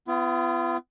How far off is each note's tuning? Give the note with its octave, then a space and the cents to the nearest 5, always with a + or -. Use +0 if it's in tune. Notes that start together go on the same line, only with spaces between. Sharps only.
B3 +30 F4 -40